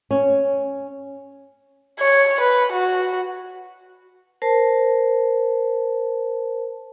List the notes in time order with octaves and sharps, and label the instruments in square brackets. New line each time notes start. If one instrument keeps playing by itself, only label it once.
[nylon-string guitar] C#4
[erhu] C#5
B4
F#4
[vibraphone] A#4 C5 A5